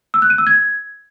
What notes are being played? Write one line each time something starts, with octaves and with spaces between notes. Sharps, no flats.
E6
F#6
D#7
E6
G#6